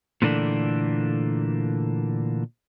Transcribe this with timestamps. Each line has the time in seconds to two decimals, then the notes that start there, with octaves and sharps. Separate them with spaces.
0.22 A#2 D3 E3 A3 A#3 D4